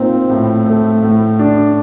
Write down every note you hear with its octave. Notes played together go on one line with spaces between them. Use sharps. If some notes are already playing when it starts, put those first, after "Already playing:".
Already playing: A#2 C4 D#4
A2
A3
A2
D4